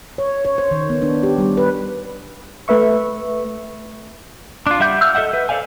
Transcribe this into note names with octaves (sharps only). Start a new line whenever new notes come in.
C#5
C#5
C5
D#3
B3
D4
G4
G3
B4
A3 B4 E5 C#6
D4 F4
G3 E5 F#5 G6
E6 F6 G6
A4 D#5 E5 F#5
B4
A4 C5 D5 F5 G#5